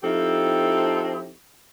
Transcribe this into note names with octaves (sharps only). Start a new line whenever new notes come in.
F3 C4 D#4 E4 G4 A4